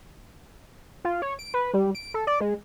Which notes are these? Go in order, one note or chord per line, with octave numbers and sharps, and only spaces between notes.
F4
C#5
D7
B4
G3
D7
A4
D5
G#3